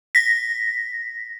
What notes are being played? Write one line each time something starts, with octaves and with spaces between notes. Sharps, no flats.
A#6 B6